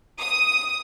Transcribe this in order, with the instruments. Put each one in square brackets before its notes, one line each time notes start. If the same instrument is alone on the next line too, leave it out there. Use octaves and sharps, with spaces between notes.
[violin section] D#6